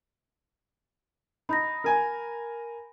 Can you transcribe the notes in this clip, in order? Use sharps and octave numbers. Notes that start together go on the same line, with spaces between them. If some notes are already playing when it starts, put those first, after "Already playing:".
D#4 B5 G6 A#6
A#4 G#5